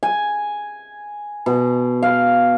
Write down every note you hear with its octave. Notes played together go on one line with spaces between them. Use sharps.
G#5
B2
F5